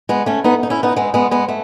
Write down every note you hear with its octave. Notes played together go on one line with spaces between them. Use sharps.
G#3 B3
A3 C#4
B3 D#4
D#4
C#4 E4
B3 D#4
G#3 B3
G#3 B3
G#3 B3
A3